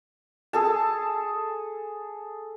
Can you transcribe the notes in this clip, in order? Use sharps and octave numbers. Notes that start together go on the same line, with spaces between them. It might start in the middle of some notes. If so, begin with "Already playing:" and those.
G#4 A4 A5